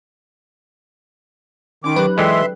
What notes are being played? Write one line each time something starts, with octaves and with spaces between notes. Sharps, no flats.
D#3 C#4 D#4 D6
F#3 G4 B4 F#6
E3 G#3 A4 D5 E5 G5 C6